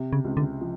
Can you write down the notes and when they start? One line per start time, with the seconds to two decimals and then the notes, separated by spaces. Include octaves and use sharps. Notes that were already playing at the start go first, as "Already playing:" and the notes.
Already playing: C3
0.13 C#3
0.24 C#2
0.37 D3
0.61 F3